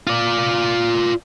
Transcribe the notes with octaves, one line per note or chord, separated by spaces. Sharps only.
F4 D5